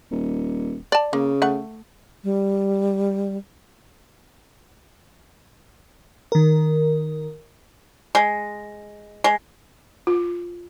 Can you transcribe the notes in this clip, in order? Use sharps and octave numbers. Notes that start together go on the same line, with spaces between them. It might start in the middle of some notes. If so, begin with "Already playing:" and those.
D#1
D5 A5
C#3 A#3
A3 F#5
G3
D#3 A#4
G#3
G#3
F4